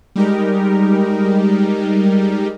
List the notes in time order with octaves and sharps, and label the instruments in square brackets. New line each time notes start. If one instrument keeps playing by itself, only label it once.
[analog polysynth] G3 G#3 D#4 G4 A#4